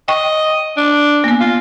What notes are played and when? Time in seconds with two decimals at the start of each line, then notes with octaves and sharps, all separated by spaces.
0.08 D#5 G5 C#6
0.77 D4
1.24 A#3 B3
1.41 F4